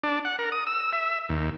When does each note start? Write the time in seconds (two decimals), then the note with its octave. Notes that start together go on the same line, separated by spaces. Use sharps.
0.04 D4
0.25 F#5
0.39 A#4
0.52 D#6
0.67 E6
0.93 E5
1.29 D#2